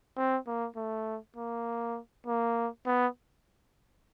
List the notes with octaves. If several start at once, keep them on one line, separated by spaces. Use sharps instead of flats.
C4
A#3
A3
A#3
A#3
B3